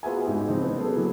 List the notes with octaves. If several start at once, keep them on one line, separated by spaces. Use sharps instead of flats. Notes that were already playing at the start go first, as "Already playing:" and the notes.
B3 F4 F#4 G#4 E5 G#5
A1 G#2 D#4 E4 G4 G#4
E3 F3 C4 D#4
B3 C#4
F#3 B3 C#4 G#4 A4
E3 F#3 A3 A#3 C#4 E4